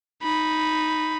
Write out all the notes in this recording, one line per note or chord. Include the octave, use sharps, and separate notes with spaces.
D#4 B5